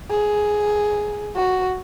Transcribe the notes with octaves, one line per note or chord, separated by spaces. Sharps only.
G#4
F#4